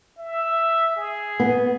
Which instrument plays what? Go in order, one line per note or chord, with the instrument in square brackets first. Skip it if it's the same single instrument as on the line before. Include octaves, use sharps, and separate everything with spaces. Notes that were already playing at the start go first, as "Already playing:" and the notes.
[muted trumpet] E5
G#4
[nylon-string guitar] B3